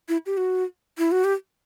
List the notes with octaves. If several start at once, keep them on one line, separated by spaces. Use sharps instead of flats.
E4
G4
F#4
E4
F#4
G4